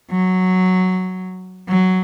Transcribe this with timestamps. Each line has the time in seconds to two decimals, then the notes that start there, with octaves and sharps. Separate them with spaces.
0.11 F#3
1.69 F#3